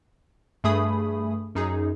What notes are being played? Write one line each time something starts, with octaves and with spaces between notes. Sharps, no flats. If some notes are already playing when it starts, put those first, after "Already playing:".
G2 A3 G#4 B5 D#6
F#2 D#4 G#4